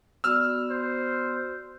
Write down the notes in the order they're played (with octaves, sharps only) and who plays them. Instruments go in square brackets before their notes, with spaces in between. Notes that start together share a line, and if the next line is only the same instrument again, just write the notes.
[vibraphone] B3 F#4 D5 [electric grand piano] E6 F6
[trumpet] C5